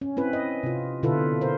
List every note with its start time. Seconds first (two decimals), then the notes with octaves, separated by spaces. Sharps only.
0.01 C#4
0.17 C4 E4 B4
0.33 D#5
0.63 C3 F4
1.03 B2 D3 E4 F4 A4 B4
1.41 A#4 C5